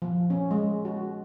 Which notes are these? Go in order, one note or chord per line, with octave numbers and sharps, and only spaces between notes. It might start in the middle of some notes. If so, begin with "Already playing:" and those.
F3
C#4
G#3
F#4